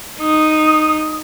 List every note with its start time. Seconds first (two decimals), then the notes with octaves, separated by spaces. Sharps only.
0.21 D#4 D#6